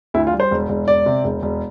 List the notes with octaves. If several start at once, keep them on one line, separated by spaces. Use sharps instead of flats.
D2 E4
F4
G3
C5
E1
E1
E1 D5
C3
E1
E1